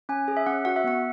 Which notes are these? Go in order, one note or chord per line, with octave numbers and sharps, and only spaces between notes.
C#4 G#5
G#4
E5
C#4 F#5
F#4 F#5
E5
B3 F#5